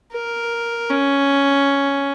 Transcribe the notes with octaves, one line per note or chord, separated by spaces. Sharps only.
A#4
C#4